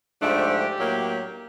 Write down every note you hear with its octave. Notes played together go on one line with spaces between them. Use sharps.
G#2 F3 A3 D4 G4
A2 F#3 A#3